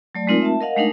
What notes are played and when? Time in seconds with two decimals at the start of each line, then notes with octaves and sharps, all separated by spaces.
0.15 F#3 A3 D5
0.27 G#3 A3 C4 D#4 F4 A#4
0.42 E5 A5
0.61 A#4 D#5 F5 F#5
0.76 G#3 A3 D4 D#4 A#4